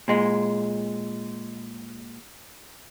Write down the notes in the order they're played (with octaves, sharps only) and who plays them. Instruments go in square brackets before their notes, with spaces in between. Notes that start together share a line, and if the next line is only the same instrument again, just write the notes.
[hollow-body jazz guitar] A#2 G#3